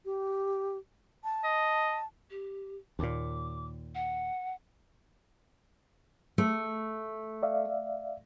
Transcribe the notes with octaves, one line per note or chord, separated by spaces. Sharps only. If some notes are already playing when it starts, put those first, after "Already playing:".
G4
A5
D#5
G4
D#2 A#2 D6
F#5
A3
D5 E5 F5